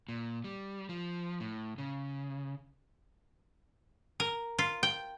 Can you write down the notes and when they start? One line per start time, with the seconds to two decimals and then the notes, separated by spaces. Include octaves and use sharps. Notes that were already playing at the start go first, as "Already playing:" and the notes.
0.09 A#2
0.44 G3
0.89 F3
1.40 A2
1.78 C#3
4.20 A#4
4.59 F4
4.83 G5